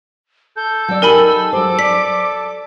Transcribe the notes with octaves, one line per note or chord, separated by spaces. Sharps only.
A4 G6
F#3 D5 E6
D#4 G4 A#4 G#5 B5
F#3 C5 D6
D5 B6